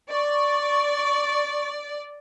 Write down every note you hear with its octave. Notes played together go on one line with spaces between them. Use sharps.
D5 C#6